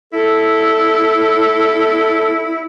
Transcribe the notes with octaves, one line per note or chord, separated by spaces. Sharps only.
E4 A4